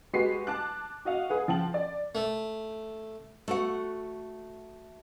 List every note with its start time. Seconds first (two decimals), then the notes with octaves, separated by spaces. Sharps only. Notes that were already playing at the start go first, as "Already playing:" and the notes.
0.13 G#3 F#4 G4 B4 B6 C7
0.47 A5 D6 F#6
1.05 F#4 D#5 F5 F#5
1.29 G#4 B4 F#5
1.48 F3 G5 A5 F#7
1.74 D5
2.15 A3
3.48 A3 F#4 F#5